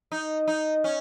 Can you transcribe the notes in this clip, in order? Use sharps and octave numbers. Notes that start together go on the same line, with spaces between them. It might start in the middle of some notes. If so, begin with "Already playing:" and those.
D#4
D#4
C#4